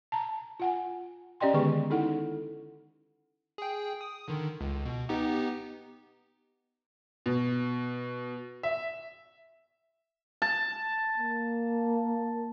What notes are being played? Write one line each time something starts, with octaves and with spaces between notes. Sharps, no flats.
A5 A#5
F4 F#5 G#5
C#4 G4 D5 D#5 G5 C6
D3 D#3 G#3 B3 G#4 C#6
D#4 E4 A4 F#5
G#4 G5
D#6
D3 D#3
C#2
B2
B3 D#4 G4
B2
E5
A5
A#3